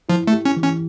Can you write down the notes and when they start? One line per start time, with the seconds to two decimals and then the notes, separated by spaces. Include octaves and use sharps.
0.09 F3 E4
0.27 A3
0.33 G4
0.45 C#4
0.57 E3
0.63 C#4